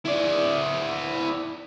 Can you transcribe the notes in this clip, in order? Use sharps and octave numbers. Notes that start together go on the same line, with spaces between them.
E4 D5